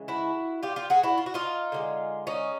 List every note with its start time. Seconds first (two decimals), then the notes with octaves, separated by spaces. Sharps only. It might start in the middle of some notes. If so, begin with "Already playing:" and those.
Already playing: C#3 E3 G#3
0.08 E4 F#4
0.63 F4 G4
0.76 F4 G4
0.90 F#4 G#4
1.03 E4 F#4
1.18 F4
1.26 F#4
1.34 D#4 F4
1.72 D3 F3 G#3
2.27 C#4 D#4